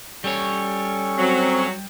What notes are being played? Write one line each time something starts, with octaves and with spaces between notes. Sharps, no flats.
G3 C#4 A4 C#5 C#6
F#3 C4